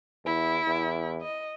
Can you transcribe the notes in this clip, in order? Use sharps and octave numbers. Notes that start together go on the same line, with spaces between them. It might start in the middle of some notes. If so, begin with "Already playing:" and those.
E2 E4
E2
D#5